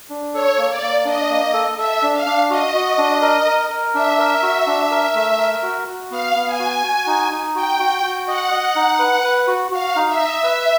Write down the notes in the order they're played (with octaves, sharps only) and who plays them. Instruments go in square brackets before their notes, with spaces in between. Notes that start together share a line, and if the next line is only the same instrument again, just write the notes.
[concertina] D4
[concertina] A4 [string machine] C#5
[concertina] A#3
[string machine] D5
[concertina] A#3
[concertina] D4 [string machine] D#5
[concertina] A#3
A4
[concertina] A4 [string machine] E5
[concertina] D4
[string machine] F5
[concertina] D4
[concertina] F#4 [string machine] D#5
[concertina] F#4
D4
A#4
A#4
A#4
[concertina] D4 [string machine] E5
[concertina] A#4
F#4
D4
A#4
A3
A#4
F#4
F#4
[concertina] B3 [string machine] F5
[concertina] B3
[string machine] G#5
[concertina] F#4
F#4
D#4
D#4
[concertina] F#4 [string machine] G5
[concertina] F#4
F#4
[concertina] D#5 [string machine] F#5
[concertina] D#5
D#4
B4
B4
F#4
[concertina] F#4 [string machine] F5
[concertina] D#4
[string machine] E5
[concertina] D#5
B4